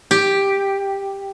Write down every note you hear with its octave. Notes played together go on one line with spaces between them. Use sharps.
G4